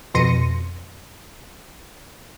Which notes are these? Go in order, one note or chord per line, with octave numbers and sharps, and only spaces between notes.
F2 B2 C6 A#6 C#7 D#7